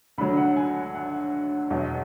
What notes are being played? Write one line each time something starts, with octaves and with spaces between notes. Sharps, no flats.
D2 D3 F#3 B5
F#5
G#5
F#5
E2 B2 F#3